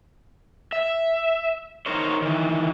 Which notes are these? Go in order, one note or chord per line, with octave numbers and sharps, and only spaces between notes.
E5
D#4 A#4 C5 C#5
D#3 E3